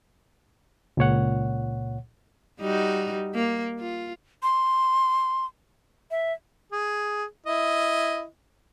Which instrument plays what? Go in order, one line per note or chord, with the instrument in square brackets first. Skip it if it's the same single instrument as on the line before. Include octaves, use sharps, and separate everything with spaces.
[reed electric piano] C#2 A#2 C#5 F#5
[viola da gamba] G3 D#4 F#4
A#3
F4
[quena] C6
E5
[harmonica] G#4
E4 D#5